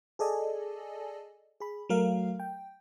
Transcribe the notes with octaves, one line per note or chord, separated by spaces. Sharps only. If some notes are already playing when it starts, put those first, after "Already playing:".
G#4 A4 D5 D#5 G#5 A5
G#4 B5
F#3 A3 A#4 F5
G5